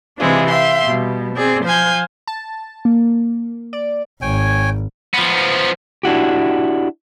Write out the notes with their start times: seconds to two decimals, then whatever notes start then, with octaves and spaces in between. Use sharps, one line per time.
0.18 C3 E3 G#3 C4 D4 F4
0.49 E5 F5 G5 C6
0.84 B2 G3
1.35 C4 G#4 D5
1.65 F3 C5 F5 G#5 G6
2.27 A5
2.85 A#3
3.73 D5
4.22 G#1 C#5 G5 G#5
5.14 F3 B3
6.03 D4 E4 F#4 G4